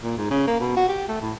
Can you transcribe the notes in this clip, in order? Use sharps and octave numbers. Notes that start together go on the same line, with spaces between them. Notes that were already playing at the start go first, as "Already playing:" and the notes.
A#2
G#2
C#3
A#3
B2
F#4
G4
A3
A2